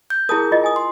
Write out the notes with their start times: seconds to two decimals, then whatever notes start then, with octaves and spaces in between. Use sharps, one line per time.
0.10 G6
0.29 E4 G#4 A#4 A5 D#6
0.52 F4 D#5
0.64 G#5 D#6
0.76 C6